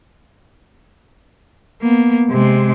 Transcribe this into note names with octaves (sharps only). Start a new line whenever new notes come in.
A#3 B3
C3 G#3